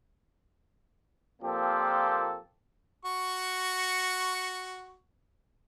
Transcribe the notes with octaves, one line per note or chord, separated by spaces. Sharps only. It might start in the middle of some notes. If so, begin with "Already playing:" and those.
A#2 F3 A#3 C4 G4 A4
F#4 C#6